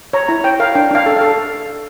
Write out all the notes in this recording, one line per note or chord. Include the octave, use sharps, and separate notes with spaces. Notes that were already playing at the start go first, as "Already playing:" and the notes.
C#5 A#5
E4 A#5
C#5 G5
A#4 F5
D4 G5
D4 F5
A4
A4 F5